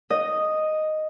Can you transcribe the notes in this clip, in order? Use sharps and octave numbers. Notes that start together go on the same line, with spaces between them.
D#5